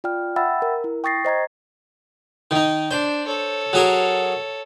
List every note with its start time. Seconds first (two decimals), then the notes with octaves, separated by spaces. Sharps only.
0.04 F4 D5 G5 F6
0.36 E5 F#5 G5 B5 E6 A6
0.62 A#4
0.84 E4
1.04 G5 C#6 D#6 A6 A#6 C7
1.25 C5 D#5 A#5 G#6
2.51 D#3 D#4
2.91 D4 C5
3.26 A4 C#5
3.73 F#3 G#4 A#4